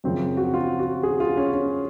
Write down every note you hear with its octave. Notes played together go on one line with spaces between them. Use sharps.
F#2 C#3 F3 C4
F#4
F4
F#4
G#4
F4
C#4
C#4